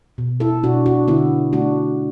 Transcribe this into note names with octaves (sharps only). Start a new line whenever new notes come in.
B2
E4 A4
B2 D4 F#4
D4 F#4
D3 B3 E4
A3 D4 F#4